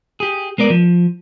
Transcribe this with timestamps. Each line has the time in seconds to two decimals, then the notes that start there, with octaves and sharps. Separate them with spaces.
0.20 G4 G#4
0.58 G#3 B3 A#4 D5
0.70 F3